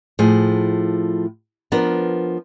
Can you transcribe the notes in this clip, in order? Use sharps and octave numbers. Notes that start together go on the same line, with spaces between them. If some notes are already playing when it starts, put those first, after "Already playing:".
A2 F3 G#4
F3 B3 D4 A#4